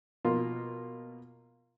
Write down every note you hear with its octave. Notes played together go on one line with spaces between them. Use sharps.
B2 A#3 F4